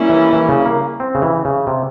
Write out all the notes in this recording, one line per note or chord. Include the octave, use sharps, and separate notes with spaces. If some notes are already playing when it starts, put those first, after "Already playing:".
Already playing: G3 A#3 C#4 E4
E3
E3
C#3
A#3
C4
C#3
E3
C#3
C3